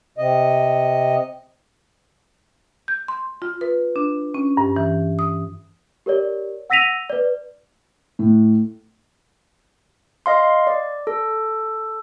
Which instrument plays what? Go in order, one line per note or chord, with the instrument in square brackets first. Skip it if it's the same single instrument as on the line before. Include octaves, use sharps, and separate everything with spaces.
[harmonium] C3 D#5
[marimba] G6
C6
F4
B4
D4
C#4
G2
E3
D#6
[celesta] G4 A#4 C#5 D5
F#5 E6 A#6 B6 D#7 F7
B4 D5
[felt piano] A2
[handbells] D#5 F5 C6
D5
A4